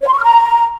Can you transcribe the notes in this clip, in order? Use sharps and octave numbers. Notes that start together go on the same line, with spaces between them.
C#5
C6
C#6
F6
A#5